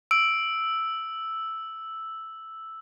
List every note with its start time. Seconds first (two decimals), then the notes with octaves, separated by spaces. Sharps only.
0.11 E6 D7